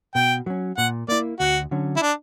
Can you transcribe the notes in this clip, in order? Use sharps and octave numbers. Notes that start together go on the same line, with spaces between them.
B2 G5
F#3 C#4
A#2 F#5
A#3 E4 D5
D2 F#4
D3 F#3 C#4
E4
D4